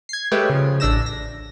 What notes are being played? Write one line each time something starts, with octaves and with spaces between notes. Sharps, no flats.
G#6 C7
G#3 A3 G4 B4 C#5 G5
C#3 F3
A1 D4 E6 A#6 E7
A#6